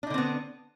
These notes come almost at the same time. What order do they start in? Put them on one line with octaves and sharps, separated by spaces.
D4 D#4 D3 C4 B3